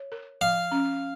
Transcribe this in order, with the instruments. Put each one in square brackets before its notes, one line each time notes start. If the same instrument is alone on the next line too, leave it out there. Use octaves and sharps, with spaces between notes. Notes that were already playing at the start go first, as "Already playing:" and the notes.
Already playing: [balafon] C#5
A#4
[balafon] F3 [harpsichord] F5
[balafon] C#4